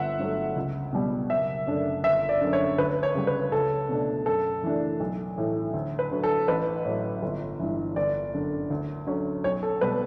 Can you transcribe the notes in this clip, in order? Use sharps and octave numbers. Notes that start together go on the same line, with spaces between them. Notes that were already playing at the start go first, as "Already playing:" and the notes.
Already playing: G1 E5 F#5
G2 F#3 A3
C#2
B2 G3 B3
F#1 E5
F#2 D3 A3 D4
G1 E5
D5
F#2 D3
C#5
D2 B4
C#5
C#3 G3
B4
C#2 A4
B2 A3 D4
F#2 A4
E3 A3 D4
B1
A2 E3 A3
D2
B4
D3 F#3
A4
A1 B4
A2 F#3
G1
G2 E3
G1 D5
F#2 D3
D2
D3 F#3 C#4
B1 C#5
A4
B2 G3 B4